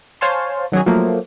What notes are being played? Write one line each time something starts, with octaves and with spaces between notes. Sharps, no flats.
C5 C#5 F5 G#5 A5 C6
D#3 F#3 C#4 G#4
F3 F#3 A3 A#3